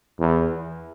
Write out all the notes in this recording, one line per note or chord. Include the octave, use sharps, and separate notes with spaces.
E2